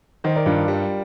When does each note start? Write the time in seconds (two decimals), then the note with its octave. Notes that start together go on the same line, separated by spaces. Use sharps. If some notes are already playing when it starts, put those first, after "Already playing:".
0.24 D#3 C5 D#5
0.36 A#4 D5
0.46 G2 D4 F4
0.68 G3